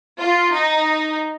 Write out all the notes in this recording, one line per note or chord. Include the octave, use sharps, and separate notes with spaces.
F4
D#4